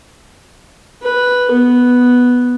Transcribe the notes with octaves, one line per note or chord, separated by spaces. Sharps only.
B4
B3